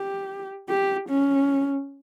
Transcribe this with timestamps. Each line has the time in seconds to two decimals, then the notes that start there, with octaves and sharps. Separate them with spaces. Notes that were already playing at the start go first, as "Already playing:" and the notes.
Already playing: G4
0.69 G4
1.09 C#4